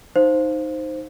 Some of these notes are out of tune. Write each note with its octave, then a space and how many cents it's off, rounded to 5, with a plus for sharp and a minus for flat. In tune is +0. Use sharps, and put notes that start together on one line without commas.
D#4 +0 C5 +0 F5 +0